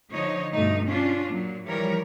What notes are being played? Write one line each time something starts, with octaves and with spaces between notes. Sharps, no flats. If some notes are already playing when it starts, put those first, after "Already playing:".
D3 F3 D#4 C#5 D#5
G2 B2 A3 D#4
C#4 D4 F4
A#2 F#3
E3 F3 G3 A#4 C#5